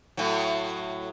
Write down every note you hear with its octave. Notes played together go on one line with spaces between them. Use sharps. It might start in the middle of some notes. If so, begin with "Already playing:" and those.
A2 F#3